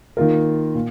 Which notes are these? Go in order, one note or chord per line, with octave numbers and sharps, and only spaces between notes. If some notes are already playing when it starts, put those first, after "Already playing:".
D#3 A#3 F4 A#4
A#2